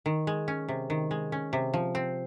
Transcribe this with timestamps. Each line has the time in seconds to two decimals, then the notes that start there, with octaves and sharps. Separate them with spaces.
0.06 D#3
0.27 G#3
0.48 C#4
0.69 C3
0.90 D#3
1.11 G#3
1.32 C#4
1.53 C3
1.74 F3
1.95 C4